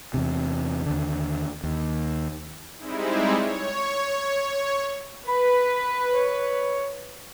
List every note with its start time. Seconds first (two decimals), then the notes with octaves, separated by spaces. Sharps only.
0.14 E2 C3
0.86 D#2 D3
1.63 D#2
2.78 G3 G#3 C4 D#4 E4
3.35 C#5
5.28 B4 B5
6.13 C#5